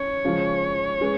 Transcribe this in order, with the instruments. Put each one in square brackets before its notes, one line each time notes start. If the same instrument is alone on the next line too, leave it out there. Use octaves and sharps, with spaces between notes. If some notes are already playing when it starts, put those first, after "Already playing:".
Already playing: [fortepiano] C#4 [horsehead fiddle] C#5
[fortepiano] C#3 F3 G#3
G#3 C#4 G#4 B4